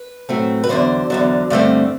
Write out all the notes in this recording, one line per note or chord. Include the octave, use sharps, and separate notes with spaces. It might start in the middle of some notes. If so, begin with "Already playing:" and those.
Already playing: B4
A2 F#3 A3 C4
B4
E2 D3 F#3 C5
E2 D3 F#3
G2 D3 A3 C4